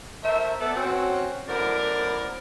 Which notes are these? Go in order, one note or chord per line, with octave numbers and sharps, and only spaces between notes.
A3 A#4 C5 E5
B3 A4 D5
C4 C#4 F#4
F#2 A2 B3 A#4 C5 D5